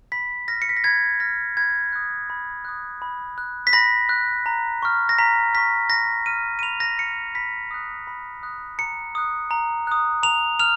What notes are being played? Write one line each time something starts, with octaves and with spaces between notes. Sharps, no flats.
B5 B6
F6 A#6
C#7
B6
A#6
B5 G#6
F6 A#6
B5 G#6
D#6 F#6
B5
D#6 F#6
B5
F#6
B6
B5 A#6
F#6
A#5
C#6 F6
A#6
A#5 B6
C#6 F6 B6
B5 A#6
F6 D#7
D#7
B5 F7
A#6
B6
F6 C#7
B5 B6
D#6 F#6
B5
D#6 F#6
A#5 C#7
D#6 F#6
A#5
D#6 F#6
A#5 F7
F6 F7